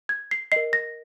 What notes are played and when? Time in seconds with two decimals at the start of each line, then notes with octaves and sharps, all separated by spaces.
0.09 G#6
0.31 C7
0.52 A#4 D#5 C7
0.73 A#6